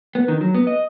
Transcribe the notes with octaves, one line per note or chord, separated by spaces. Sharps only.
B3
D#3
F#3
B3
D#5